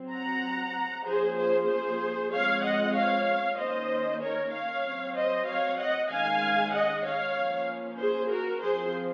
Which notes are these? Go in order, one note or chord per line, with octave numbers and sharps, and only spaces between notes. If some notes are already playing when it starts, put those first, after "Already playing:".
Already playing: F#3 C4
F#5 A#5
F3 A#3 C#4 G#4 C5
G#4 C5
G#4 C5
F3 G#3 C4 C#5 F5
D#5 F#5
C#5 F5
D#3 A#3 C#4 C5 D#5
A#4 C#5
C#5 F5
F#3 C4
C5 D#5
C#5 F5
D#5 F#5
D#3 G#3 C#4 F5 G#5
D#5 F#5
C#5 F5
F3 A#3 C#4
G#4 C5
F#4 A#4
F3 C4 G#4 C5